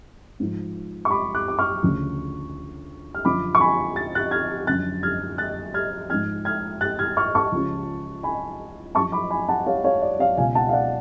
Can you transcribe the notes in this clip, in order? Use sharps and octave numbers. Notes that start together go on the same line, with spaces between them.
G#2 F3
C#6
B5 D6
D6 F#6
D6
C#6 F6
D2 C#3 F3
F6
F#2 D3 F3 B5 D6
C#6
G#5 B5
A6
F#6 A6
F6 G#6
F#2 D3 F3 F#6 A6
F6 G#6
F#6 A6
F6 G#6
G#2 F3 F6 G#6
F6 G#6
F#6 A6
F6 G#6
C#6 F6
A5 C#6
C#2 C#3 F3
G#5 B5
F#2 A5 C#6
F3
B5 D6
G#5 B5
F#5 A5
C#5 F5
C#5 F5
D5
C#5 F5
C#2 B2 F5 G#5
F#5 A5
F5
D5 F#5